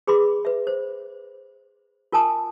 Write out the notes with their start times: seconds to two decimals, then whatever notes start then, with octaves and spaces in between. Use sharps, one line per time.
0.07 G#4 B4 B5 C6 D6
0.45 B4 E5
0.67 C5
2.12 F4 A#4 G#5 A5 D#6